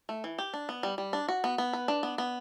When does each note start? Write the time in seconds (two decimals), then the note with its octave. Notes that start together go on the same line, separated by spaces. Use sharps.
0.09 A3
0.24 E3
0.38 G4
0.53 D4
0.69 B3
0.83 G3
0.98 G3
1.13 D4
1.28 F#4
1.44 B3
1.58 B3
1.73 B4
1.88 D4
2.03 B3
2.18 B3